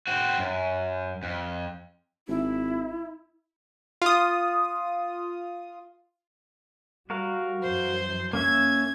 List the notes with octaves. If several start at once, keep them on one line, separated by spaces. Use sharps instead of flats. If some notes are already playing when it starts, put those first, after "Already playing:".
C4 F#4
F#2
F2
G#1 E4
F4 D#6
G3 F#4 A#4 F5
F#2 E3 F#3 C5
A#3 C#4 E5 G#6